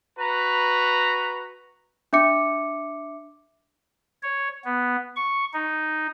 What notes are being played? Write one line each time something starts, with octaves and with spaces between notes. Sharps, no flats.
F#4 B4 A#5
D4 E5 D6 C#7
C#5
B3
C#6
D#4